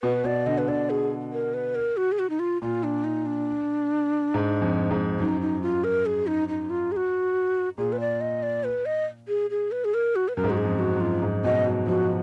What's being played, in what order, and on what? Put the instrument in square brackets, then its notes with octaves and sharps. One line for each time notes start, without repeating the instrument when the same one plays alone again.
[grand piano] B2 [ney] B4
[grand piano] B2 [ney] D5
[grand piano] D3 [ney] D#5
[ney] B4
[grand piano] D3 [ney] D5
[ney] G#4
A#4
B4
A#4
F#4
G#4
F#4
D#4
F4
[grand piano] A#2 [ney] F4
[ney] D4
D#4
D4
[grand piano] G#2
F2
G#2
[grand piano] F#2 [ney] D#4
[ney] D#4
F4
A#4
G#4
D#4
D#4
F4
G#4
F#4
[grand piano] A#2 [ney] G#4
[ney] B4
D5
D#5
D5
B4
D#5
G#4
G#4
B4
G#4
A#4
F#4
B4
[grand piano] F#2 [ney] A#4
[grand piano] G#2
[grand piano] F#2 [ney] F#4
[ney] G#4
[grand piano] F2
[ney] F#4
[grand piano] F#2
[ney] F4
[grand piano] G#2
[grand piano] B2 [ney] D#5
[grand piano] F#3
[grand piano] F3 [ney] F#4